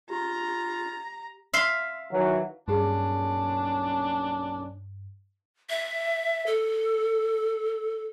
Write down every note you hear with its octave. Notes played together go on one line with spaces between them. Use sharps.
F4 G4 A#5
E5 F5 C6
D#3 E3 F#3
B1 G2 A#2 C#4 D4 F4 G4 G#4
E5
A4